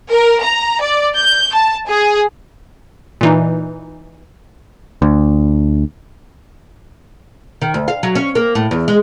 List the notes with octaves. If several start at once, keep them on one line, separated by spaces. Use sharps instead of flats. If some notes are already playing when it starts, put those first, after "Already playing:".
A#4
A#5
D5
G6
A5
G#4
A#2 E3 D#4
D2
D#3
D2
F5
F#3
C#4
A#3
A2
E2
G#3